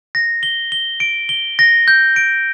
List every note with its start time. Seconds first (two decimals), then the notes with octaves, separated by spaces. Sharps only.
0.15 A#6
0.43 G7
0.72 G7
1.00 D7
1.29 G7
1.59 A#6
1.88 G6
2.16 D7